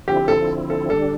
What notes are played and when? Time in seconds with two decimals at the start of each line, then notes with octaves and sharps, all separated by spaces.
0.08 D3 F3 C4 E4 G4
0.28 A4
0.70 A4
0.90 D3 G3 D4 A4